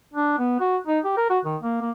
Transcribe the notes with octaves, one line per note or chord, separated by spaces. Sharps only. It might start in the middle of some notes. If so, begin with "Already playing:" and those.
D4
B3
F#4
D#4
G4
A#4
F#4
D#3
A#3
A#3